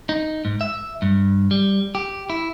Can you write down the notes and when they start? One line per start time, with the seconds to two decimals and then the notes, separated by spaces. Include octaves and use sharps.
0.09 D#4
0.45 G#2
0.61 E5
1.02 G2
1.51 G3
1.95 G4
2.30 E4